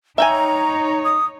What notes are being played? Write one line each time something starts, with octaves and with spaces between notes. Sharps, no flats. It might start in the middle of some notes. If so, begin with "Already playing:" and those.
D#4 C#5 E5 G5 G#5 A#5
D#6